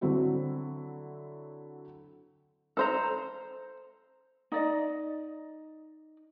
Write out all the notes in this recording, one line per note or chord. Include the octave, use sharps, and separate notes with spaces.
D3 F#3 C4 E4 F#4
A4 C5 A#5
D#4 D5 D#5